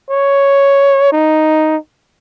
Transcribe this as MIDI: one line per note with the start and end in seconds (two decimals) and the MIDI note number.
0.10 1.12 73
1.12 1.77 63